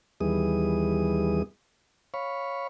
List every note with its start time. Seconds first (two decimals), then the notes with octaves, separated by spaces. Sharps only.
0.21 D#2 E3 G3 B3 G#4 D#6
2.14 C#5 F5 B5 C#6